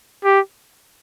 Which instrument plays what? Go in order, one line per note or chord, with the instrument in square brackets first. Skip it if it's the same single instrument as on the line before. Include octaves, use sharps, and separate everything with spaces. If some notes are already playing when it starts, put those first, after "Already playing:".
[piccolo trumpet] G4